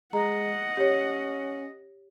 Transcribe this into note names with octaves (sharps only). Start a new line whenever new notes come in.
G#3 D#5 F#5 A#5
C#4 G4 C#5